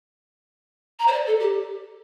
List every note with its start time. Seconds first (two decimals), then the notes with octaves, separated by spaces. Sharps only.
0.99 A#5
1.08 C5
1.12 D5
1.27 A4
1.40 G4